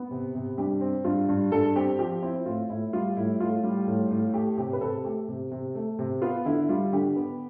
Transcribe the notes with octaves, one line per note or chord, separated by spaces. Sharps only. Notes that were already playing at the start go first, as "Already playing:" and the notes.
Already playing: B3
C3
C3
G2 G4
C4
G2 F4
G2
G2 A4
C4 G4
F3 G4
C4 E4
A2 F4
A2 E4
G3 F4
A2 E4
A2 F4
G3
A2
A2
A3 G4
C3 G4
B4
C3 A4
A3 G4
C3
C3
A3
C3
B3 F4
D3 E4
G3 F4
D3 G4
B3